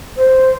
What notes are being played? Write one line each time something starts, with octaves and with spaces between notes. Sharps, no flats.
C5